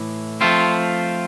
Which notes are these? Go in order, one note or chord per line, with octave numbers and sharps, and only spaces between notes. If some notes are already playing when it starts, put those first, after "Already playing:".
Already playing: A2 E3
F3 A3 C4 F4